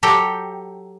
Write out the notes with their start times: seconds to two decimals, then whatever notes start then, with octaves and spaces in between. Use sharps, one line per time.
0.03 F#3 G4 A4 G5 A#5